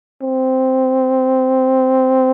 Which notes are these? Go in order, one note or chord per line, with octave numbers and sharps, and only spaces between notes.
C4